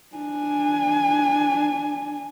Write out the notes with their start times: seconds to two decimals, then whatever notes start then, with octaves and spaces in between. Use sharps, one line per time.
0.16 D4 G#5